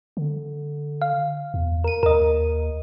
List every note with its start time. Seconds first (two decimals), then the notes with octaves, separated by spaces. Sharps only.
0.17 D3
1.02 F5
1.54 E2
1.84 A#4 D#7
2.03 D#2 A#4 D#5